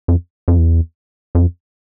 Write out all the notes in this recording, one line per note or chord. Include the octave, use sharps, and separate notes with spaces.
F2
F2
E2
F2